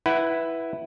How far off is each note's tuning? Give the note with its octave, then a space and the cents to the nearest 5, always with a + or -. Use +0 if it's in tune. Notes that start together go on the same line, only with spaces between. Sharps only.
E4 +0 B4 +0 F#5 +25